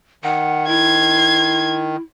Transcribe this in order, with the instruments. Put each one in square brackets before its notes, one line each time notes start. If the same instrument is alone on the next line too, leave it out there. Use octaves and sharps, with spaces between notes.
[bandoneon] D#3 [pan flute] F#5
[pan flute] E4 [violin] C6 G#6